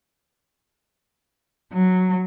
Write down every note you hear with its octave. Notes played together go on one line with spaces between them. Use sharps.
F#3